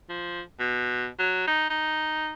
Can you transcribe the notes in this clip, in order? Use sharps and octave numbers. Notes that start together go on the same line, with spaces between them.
F3
B2
F#3
D#4
D#4